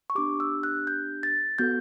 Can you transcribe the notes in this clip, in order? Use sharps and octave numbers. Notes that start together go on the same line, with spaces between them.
C#6
B3 D4 G4 D6
E6
F#6
G6
A6
B3 F#4 A4 G6